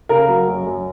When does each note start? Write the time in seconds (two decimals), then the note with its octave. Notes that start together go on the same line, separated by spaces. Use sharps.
0.09 C#3 A#4
0.28 F#3
0.48 F#2
0.66 F#2